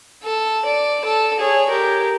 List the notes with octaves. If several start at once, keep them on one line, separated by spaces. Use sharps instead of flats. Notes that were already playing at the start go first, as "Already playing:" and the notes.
A4
D5
A4
G#4 C#5
G4 A#4